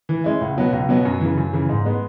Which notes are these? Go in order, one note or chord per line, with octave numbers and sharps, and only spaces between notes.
E3
G#3 C#4 E4
C#2
B2 F#3 B3
C#2
B2 F#3 B3
F#2
C#3 E3
F#2
C#3 E3
G#2
G#3 B3